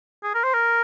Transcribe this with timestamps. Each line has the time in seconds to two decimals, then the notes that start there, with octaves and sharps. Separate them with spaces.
0.24 G#4
0.35 A#4
0.44 C5
0.54 A#4